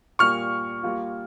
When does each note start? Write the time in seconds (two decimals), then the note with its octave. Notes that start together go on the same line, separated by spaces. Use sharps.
0.19 A#2 G3 A#3 C#6 F6
0.83 G3 A#3 F4